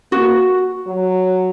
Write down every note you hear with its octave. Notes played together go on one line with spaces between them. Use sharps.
A#3 F#4
F#3